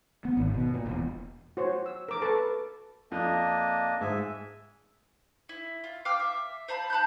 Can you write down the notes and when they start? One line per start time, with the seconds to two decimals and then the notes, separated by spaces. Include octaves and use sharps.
0.25 B3
0.37 G#1
0.54 B2
0.74 A#2
0.86 E1
1.57 F#4 C5 C#5
1.86 E6
2.09 A#4 D6
2.22 A4 B4 A5 C#6
3.12 F2 A#3 D4 D#5
4.01 G#2 E5 G#5
5.49 E4
5.84 F4
6.05 F5 G5 D6 F6
6.19 E5
6.68 C5 F5 A5 B5
6.90 A5 B5 F#6 G6